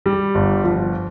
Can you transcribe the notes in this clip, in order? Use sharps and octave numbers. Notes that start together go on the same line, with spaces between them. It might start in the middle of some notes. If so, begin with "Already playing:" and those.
G3
G1
F3